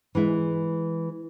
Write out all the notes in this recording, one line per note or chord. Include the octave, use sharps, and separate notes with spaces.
E3 G#3 E4